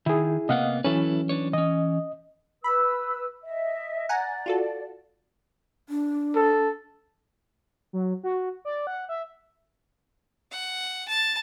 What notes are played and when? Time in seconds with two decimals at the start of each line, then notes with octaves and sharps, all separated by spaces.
0.06 D#3 E4 G#4
0.49 C3 A#3 B3 D#5 F5 F#5
0.84 E3 F#3 C#4 E4 A4 B4
1.29 D4 B4 C#5
1.53 E3 C#4 D#5
2.64 B4 B5 E6
3.43 D#5 E5
4.09 D5 F#5 G#5 A#5
4.46 F4 F#4 A4
5.89 D4
6.35 A4
7.93 F#3
8.23 F#4
8.65 D5
8.87 F#5
9.09 E5
10.52 F#5
11.08 A5